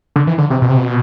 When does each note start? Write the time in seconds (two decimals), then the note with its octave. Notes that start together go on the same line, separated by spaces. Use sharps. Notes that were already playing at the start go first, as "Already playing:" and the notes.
0.16 D3
0.27 E3
0.38 D3
0.50 C3
0.62 B2
0.69 C3
0.78 B2